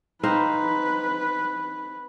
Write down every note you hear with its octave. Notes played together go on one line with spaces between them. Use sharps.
C4 D#4 B4 F5